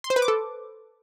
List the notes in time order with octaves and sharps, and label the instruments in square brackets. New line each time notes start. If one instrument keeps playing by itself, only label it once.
[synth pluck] C6
C5
B4
D6
A4